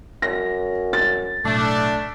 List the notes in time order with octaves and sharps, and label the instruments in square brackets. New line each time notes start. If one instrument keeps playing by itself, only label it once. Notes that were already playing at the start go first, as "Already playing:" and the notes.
[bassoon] F#2 [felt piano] A#6
[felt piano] A6
[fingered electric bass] B1 A2 [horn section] A3 D4